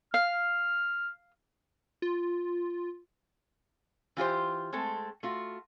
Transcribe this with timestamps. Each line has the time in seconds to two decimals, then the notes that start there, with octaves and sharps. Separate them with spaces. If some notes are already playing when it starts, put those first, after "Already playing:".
0.14 F5 F6
2.02 F4
4.17 E3 F4 G4 C5
4.73 G#3 A3 C4 A4
5.23 A3 F4 F#4